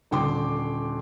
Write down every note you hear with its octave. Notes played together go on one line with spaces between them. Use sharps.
D#1 D3 G5 C6 D6